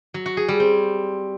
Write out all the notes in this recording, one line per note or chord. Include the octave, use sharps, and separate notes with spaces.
F#3
F#4
G#4
G3
C4